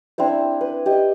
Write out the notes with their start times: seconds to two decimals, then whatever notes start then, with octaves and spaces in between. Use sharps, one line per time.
0.18 C4 D4 E4 C5
0.61 B4
0.86 G4 D#5